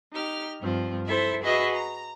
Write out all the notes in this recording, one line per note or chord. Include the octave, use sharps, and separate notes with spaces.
D#4 G4 F6
G2 F3 C4
E4 A4 C5 E5
F#4 G#4 B4 D#5 E5
A#5